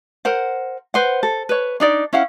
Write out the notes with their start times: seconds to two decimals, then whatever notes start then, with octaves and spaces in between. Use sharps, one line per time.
0.25 A#4 C5 F#5
0.94 B4 C5 F#5
1.23 A4
1.49 B4 C#5
1.80 D4 D#4 D5
2.13 C#4 E4 F5 F#5